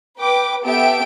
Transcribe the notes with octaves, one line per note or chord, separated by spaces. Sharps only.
B4 G5 D6
B3 G4 A4 E5 G5 D7